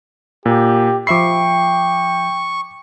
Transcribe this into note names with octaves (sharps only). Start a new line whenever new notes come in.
A#2 G4
F3 E5 G5 B5 C#6 D6 C7